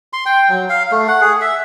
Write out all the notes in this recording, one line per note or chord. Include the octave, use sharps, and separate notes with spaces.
C6
G5
F#3
F5
A3
F#5
G#4
E5